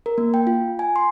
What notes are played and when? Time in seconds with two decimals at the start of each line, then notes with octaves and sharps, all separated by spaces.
0.06 A#4
0.18 A#3
0.34 G5
0.47 F4
0.79 G#5
0.96 C6